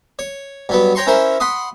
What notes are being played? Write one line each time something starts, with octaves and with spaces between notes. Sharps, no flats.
C#5
G2 F#3 B3
C#5 G5 A#5 C6 C#6
C#4 E4 A#4 C5
F#5 B5 C6 D#6